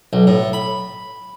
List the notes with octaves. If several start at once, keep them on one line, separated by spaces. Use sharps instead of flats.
B1
A2
B5